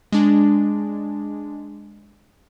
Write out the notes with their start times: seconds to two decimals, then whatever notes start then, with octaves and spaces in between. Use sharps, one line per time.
0.12 G#3 D4